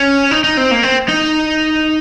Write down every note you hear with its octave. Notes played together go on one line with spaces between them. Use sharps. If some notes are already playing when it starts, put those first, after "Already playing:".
Already playing: C#4
D#4
D#4
C4
A#3
C4
D#4